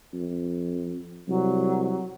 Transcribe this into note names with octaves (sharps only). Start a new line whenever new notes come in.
F2
C2 F#3